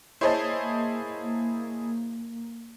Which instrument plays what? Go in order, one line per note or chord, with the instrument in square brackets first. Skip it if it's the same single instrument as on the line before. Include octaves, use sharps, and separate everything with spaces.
[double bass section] A#3 [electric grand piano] E4 G#4 A5 [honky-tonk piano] C5 C#5 D#5